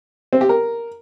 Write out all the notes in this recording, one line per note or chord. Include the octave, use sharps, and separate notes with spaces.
C4
G4
A#4